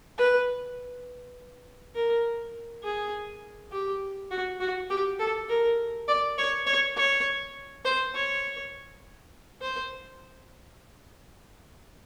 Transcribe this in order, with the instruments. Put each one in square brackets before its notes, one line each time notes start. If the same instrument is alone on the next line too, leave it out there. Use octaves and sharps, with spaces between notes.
[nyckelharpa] B4
A#4
G#4
G4
F#4
F#4
G4
A4
A#4
D5
C#5
C#5
C#5
C5
C#5
C5